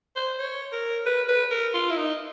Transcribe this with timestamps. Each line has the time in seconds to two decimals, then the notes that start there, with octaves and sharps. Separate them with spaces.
0.16 C5
0.39 C#5
0.72 A#4
1.06 B4
1.28 B4
1.51 A#4
1.74 F4
1.90 E4
1.97 D#4